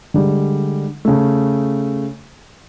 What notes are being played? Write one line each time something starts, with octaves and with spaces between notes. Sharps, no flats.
D3 G3 G#3
C#3 A3